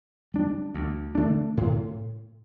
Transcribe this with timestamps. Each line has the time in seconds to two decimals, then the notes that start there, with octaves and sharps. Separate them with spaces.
0.34 G3 D4
0.74 D2
1.15 D3 A3 D4
1.57 A2